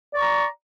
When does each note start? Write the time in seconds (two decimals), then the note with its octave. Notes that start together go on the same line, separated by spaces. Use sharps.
0.12 D5
0.15 C#6
0.19 A#5